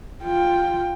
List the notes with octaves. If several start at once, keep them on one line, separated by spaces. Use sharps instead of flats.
F4 G5